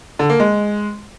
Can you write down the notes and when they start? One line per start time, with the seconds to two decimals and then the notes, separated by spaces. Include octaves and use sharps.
0.19 D3
0.30 A#3
0.40 G#3